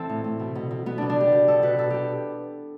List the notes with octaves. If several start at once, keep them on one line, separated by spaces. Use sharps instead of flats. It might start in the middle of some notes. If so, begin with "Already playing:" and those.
Already playing: E3 C4 A4
A2
A2
B2
B2
B2
B2 B3
B2 D4
D4
B2 G4
B2
B2 A4
B2 B4
B2 A4
B2 G4